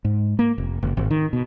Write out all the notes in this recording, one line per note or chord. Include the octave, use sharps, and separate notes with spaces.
G#2
A#3
F1
F#1
G#1
D#3
B2